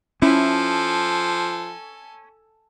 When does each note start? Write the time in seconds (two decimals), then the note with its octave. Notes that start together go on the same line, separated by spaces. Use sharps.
0.22 F3 C#4 E4 A4 G#5